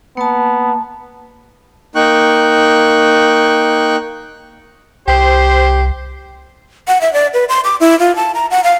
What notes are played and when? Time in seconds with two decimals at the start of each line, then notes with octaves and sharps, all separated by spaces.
0.17 A#3 B3 A5
1.95 A#3 D#4 G5 C#6 F#6
5.08 C2 G4 C5
6.88 F#5
7.01 E5
7.13 D5
7.34 B4
7.49 C6
7.64 D6
7.80 E4
8.00 F4
8.16 A5
8.34 A#5
8.51 F#5
8.64 F5